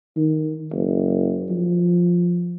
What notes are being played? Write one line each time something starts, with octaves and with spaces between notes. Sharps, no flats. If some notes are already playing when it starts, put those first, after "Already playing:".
D#3
F#1
F3